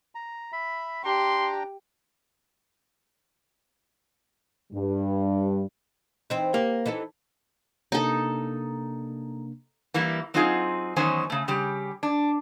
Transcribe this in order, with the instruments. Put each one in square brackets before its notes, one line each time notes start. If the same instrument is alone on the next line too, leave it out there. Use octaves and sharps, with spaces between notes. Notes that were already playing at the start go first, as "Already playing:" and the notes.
[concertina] A#5
E5 B5
[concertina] D4 G5 A#5 [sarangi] G4 [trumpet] C6
[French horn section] G2
[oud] E3 C4 D#4
[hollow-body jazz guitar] A#3 [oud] G4
[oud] E3 D#4 A4
[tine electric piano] C3 A#3 D4 [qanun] D#4 A4
[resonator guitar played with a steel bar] E3 G3 A#3 E4
F#3 C4 D#4 F4 G4 G#4
E2 D#3 F#3 C#4 C5 G#5
C#3 A3
C#3 G3 G4
D4